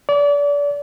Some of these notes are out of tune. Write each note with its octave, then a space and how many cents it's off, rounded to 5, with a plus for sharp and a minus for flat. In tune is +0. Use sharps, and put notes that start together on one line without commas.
D5 -35